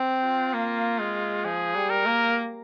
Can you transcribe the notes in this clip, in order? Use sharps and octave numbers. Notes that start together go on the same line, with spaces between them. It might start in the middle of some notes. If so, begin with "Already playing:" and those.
Already playing: C4
F4
A#3
G#3
F3 G#4
G3
A#4
A#3